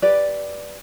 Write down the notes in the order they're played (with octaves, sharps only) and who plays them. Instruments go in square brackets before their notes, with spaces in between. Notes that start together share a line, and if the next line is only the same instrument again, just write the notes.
[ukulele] G4 B4 D5